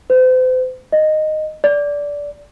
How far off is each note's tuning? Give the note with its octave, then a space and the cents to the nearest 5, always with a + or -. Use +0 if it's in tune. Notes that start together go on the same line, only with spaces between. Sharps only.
C5 -40
D#5 -10
D5 -15